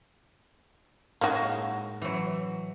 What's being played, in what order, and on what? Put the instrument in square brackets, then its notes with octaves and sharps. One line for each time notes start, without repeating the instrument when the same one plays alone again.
[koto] A2 G#3 D#4 [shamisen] A#3 F#4
[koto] E3 F#3